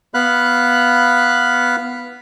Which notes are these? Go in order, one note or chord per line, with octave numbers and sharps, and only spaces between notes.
B3 F5 B5 F#6